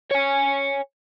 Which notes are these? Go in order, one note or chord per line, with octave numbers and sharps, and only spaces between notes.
C#5 G#5